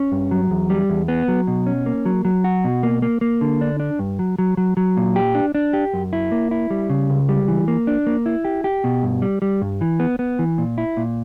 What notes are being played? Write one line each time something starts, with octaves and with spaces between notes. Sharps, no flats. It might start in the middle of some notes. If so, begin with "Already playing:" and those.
Already playing: C#4
G2
F#3
E2
G3
E2
B3
F#3
B2
C#4
A#3
F#3
F#3
F#4
B2
A#3
A#3
A#3
D3
D4
D4
G2
F#3
F#3
F#3
F#3
A#2
G4
D4
D4
G4
F#2
E4
A#3
E4
G3
C#3
C#2
G3
E3
A#3
D4
A#3
E4
G4
G4
B2
G2
G3
G3
G2
E3
B3
B3
E3
A#2
E4
A#2